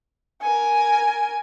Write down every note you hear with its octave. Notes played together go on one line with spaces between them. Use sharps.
A#4 G#5